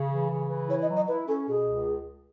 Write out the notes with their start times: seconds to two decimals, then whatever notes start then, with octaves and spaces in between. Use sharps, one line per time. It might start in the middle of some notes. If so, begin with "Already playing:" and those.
Already playing: C#3
0.11 E3
0.30 C#3
0.49 E3
0.69 E4 C#5
0.82 D#5
0.89 F#3
0.96 D#5
1.08 E4 B4
1.28 C#4 A4
1.47 B2 G#4
1.67 C#2